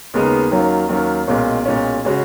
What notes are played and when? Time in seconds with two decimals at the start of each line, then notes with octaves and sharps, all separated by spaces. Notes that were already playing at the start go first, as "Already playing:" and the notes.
0.14 D#2 C#3 G#3 B3 D#4
0.51 D#2 D#3 F#3 C#4 F4
0.89 D#2 D#3 F#3 C#4 F4
1.27 B1 A#2 G#3 C#4 F4
1.65 B1 A#2 G#3 C#4 F4
2.05 C#3 G#3 C#4 F#4